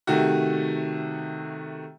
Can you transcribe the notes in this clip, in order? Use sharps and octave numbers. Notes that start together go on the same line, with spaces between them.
C3 D#3 A3 F#4